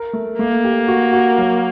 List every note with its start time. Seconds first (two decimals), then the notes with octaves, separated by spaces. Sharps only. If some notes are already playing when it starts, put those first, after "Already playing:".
Already playing: A#4
0.13 A3
0.39 A3 A#3
0.64 G4
0.88 F#4
1.13 F#4
1.38 F#3